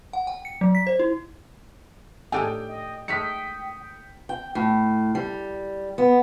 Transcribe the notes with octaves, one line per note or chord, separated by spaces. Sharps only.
F#5
G5
C#7
F#3
B6
C5
E4
A2 D4 D#4 G4 A4 G5 G#5
D#5
G#3 A3 D#4 G5 D#6 B6 C#7
G5
G5
A2
G3
B3